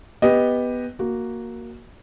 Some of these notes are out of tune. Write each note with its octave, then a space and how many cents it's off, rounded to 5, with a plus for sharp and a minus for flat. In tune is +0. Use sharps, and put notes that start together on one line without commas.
B3 +0 G4 +10 D#5 +0
A#3 +0 F#4 +0